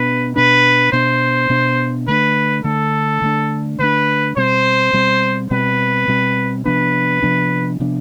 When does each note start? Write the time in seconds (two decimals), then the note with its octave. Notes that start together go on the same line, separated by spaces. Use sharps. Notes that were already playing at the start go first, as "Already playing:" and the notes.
Already playing: B2 B3 D4 B4
0.36 B2 B3 D4 B4
0.92 B2 B3 D4 C5
1.50 B2 B3 D4
2.07 D3 A3 D4 B4
2.64 D3 A3 D4 A4
3.22 D3 A3 D4
3.79 D3 A3 D4 B4
4.36 B2 G3 C4 C5
4.93 B2 G3 C4
5.50 B2 G3 C4 B4
6.08 B2 G3 C4
6.65 C3 F3 B3 D4 B4
7.22 C3 F3 B3 D4
7.80 C3 F3 B3 D4